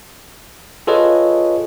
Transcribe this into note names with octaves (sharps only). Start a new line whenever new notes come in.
F4 G#4 A4 B4 C#5 D#5